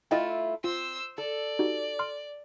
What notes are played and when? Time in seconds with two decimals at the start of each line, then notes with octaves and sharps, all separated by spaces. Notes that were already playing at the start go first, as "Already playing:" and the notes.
0.11 A3 E4 F4 D#5 G5
0.64 C4 F4 C5 E6
1.18 A4 D5
1.59 D#4 F#4 G4
1.99 C6 F6